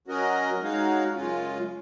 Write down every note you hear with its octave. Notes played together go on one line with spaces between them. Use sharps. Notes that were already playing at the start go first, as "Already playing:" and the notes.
F#3 C#4 F#4 A#4 D#5
G#3 D#4 F#4 C#5 F5
F#2 C#3 G#3 C#4 F4